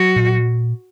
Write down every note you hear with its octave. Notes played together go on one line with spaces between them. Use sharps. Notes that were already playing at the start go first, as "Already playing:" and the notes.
Already playing: F#3 F#4
A#2